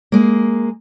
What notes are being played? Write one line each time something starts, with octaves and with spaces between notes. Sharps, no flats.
G#3 A#3